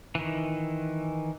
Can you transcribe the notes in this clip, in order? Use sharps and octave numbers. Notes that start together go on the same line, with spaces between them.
D#3 E3